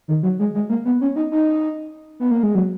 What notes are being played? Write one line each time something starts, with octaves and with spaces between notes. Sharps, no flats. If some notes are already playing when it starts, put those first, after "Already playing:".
D#3
F#3
G#3
G#3
A#3
B3
C#4
D#4
D#4
B3
A#3
G#3
F#3